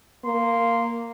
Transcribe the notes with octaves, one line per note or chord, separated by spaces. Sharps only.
A#3 C6